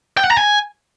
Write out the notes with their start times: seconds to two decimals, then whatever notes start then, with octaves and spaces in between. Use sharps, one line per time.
0.17 G5
0.24 F#5
0.31 A#5
0.37 G#5